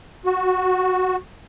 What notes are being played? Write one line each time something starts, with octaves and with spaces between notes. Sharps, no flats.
F#4